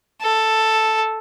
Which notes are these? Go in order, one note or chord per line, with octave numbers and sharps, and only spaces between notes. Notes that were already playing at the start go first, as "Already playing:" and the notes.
A4